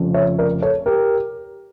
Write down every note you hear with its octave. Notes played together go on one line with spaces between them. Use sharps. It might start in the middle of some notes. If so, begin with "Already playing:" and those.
Already playing: F1 F2 C#3
C#5 E5
A#4 D5
A4 C#5
G4 A#4